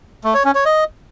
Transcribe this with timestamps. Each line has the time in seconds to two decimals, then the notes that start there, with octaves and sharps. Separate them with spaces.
0.24 A3
0.34 C#5
0.45 C#4
0.55 C#5
0.65 D#5